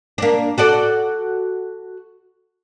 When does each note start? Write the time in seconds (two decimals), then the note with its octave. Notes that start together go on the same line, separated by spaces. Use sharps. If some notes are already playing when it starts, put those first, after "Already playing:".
0.18 A#3 D4
0.58 F#4 A4 D5